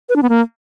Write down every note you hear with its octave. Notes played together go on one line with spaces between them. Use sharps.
B4
D4
B3
A#3